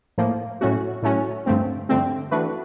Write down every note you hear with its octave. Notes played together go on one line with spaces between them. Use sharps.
A2 F3 A#3
A2 F#3 A3 C#4 F#4
A2 F#3 A3 C#4 F#4
G2 D3 F3 A3 C4
G2 D3 F3 A3 C4
E3 A3 D4 F#4 B4